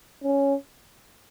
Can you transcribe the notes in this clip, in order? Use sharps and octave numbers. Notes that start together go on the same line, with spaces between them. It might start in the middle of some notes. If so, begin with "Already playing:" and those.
C#4